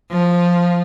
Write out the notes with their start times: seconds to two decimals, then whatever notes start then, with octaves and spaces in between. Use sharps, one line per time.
0.11 F3